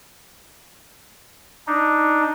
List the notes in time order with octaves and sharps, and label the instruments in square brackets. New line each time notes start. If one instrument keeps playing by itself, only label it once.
[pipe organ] D4 D#4